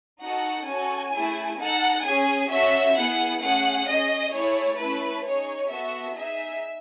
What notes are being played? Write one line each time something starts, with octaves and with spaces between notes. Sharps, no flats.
D#4 F#4 A4 F#5
C#4 F#4 A4 G#5
A3 E4 G#4
D#4 A4 F#5
C#4 G#4 G#5
C#4 F#4 A4 E5
B3 E4 G#4 F#5
A3 C#4 G#4 F#5
C#4 G#4 D#5
A3 E4 G#4 C#5
A3 C#4 E4 A4 B4
D#4 G#4 C#5
B3 F#4 A4 E5
D#4 G#4 E5